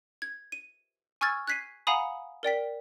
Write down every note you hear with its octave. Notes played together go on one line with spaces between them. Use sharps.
G#6
D#7
G#5 C#6 E6 F6 G#6 A6
F#6 G#6 B6 C7 D#7
F5 F#5 G#5 A#5 B5 D#6
A#4 D5 G5 B6